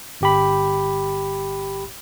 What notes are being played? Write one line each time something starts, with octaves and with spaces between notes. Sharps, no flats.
G1 G4 B5